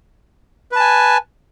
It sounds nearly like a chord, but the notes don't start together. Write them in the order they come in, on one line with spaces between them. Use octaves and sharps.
B4 A5 G#5